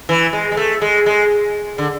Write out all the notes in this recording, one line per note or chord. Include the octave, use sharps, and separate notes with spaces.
E3
G#3
G#3
A3
G#3
G#3
D3